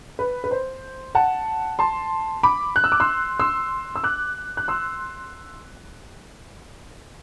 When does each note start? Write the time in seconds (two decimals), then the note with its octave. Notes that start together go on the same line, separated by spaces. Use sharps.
0.19 B4
0.44 B4
0.51 C5
1.15 F#5 A5
1.79 A5 C6
2.43 B5 D6
2.76 F#6
2.84 E6
2.92 D6
3.00 C6 E6
3.39 C6 E6
3.96 E6
4.04 D6 F#6
4.57 F#6
4.68 C6 E6